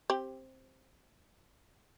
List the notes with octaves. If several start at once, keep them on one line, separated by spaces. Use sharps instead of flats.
C4 G4